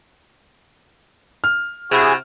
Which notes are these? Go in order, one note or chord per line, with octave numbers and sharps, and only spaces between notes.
F6
C3 E4 F#4 G#4